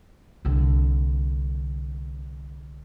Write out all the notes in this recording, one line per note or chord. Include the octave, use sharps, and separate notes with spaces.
C2 D3